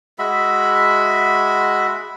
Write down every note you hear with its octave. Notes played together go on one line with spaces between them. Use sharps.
G#3 F#4 E5 B5